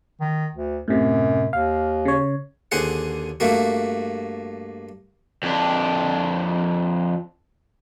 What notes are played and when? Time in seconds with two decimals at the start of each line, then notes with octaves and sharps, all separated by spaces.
0.21 D#3
0.53 D2
0.88 F#2 A2 C3
1.53 D#2 F5
2.05 C#3 C#5
2.72 D#2 D3 G#4 C5 F#5
3.40 G2 A3 A#3 F#4
5.43 F2 D4